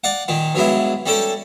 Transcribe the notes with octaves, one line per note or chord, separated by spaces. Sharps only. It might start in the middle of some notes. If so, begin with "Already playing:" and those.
D5 F5 F#5
A#2 D#3 A#3
G2 F#3 G#3 B3 E4
G3 C#4 A4 G5 A5